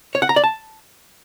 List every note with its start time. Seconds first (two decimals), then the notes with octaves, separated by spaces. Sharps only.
0.15 C#5
0.22 F#5
0.29 A#5
0.36 D5
0.44 A5